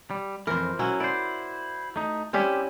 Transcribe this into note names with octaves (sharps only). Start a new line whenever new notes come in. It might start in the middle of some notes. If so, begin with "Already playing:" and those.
G3
F2 E3 A#4 C5
F#3 C#4 E4 F#4
E4 C5 D5
A3 D#4
G3 C4 C#4 E4 G4 E5